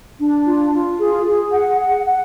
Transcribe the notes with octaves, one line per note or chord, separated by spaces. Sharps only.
D4
F4
F4
G#4
G#4
F#5
F#5
F#5